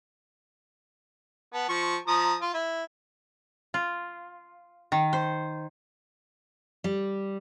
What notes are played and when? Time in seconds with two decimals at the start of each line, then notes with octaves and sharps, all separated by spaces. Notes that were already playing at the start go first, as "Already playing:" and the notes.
1.53 B3 A5
1.69 F3 C#6
2.08 F3 A#5 D#6
2.41 F4
2.54 E4
3.74 F4
4.92 D#3
5.13 C5
6.84 G3